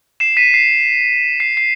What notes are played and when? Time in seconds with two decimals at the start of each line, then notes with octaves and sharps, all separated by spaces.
0.20 C7 E7
0.37 B6 D#7
0.54 C7
1.40 C7
1.57 C7